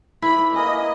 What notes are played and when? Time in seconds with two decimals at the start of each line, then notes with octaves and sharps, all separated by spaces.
0.22 E4 B4 D5 B5
0.54 A#3 G#4 B4 D#5